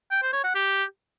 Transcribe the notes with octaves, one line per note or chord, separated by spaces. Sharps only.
G5
C5
C#5
F#5
G4